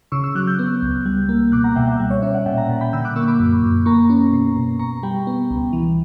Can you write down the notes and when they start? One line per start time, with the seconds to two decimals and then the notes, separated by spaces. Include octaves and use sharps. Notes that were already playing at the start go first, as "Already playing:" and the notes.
0.12 C#3 C#6 E6
0.24 C#6 E6
0.35 F#3 D6 F#6
0.47 E6 G6
0.59 B3
0.82 C#2
1.06 G3
1.29 A#3
1.52 B2 D6 F#6
1.64 F#5 A#5
1.76 B2 E5 G5
1.87 E5 G5
1.99 G3
2.11 C#5 E5
2.22 C#4 C#5 E5
2.34 D5 F#5
2.46 A#2 E5 G5
2.57 F#5 A#5
2.69 A#2
2.81 G5 B5
2.93 D3 E6 G6
3.05 D6 F#6
3.16 A#3 C#6 E6
3.28 B5 D6
3.39 F#2
3.63 F#2
3.86 A#3 A#5 C#6
4.10 C#4
4.33 B2
4.57 B2
4.79 B2 A#5 C#6
5.03 G3 G5 B5
5.27 B3
5.50 C#2
5.73 E3